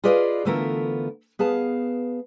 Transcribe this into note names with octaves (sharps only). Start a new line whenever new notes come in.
F4 G#4 B4 D5 D#5 F5
D3 E3 A3 B3 F4 A#4
B3 G#4 F5 A5